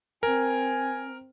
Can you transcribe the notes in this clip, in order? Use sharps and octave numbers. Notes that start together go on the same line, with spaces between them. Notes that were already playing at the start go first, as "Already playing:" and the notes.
C4 A#4 G#5